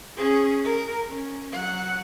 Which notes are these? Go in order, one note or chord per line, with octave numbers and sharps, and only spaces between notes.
C#4 G#4
A#4
C#4
F#3 F#5